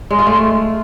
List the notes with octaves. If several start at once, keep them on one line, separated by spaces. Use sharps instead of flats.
G#3
F4
A3